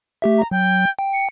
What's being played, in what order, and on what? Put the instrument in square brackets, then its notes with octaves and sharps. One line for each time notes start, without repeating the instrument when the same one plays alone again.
[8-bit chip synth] A3 G4 E5
[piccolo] A#5
[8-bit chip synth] F#3 [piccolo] G5
[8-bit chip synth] G5
[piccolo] C#7